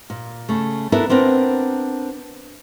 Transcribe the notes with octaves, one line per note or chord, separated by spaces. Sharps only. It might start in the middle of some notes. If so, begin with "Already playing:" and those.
A#2
C#3 A3
B3 D4 E4 A4 A#4
B3 C4 D4 A#4